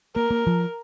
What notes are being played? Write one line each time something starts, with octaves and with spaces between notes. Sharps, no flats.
A#3 A#4
A#3
F3